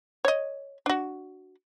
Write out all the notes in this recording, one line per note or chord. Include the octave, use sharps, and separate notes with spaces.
C#5 D#5
D4 F#4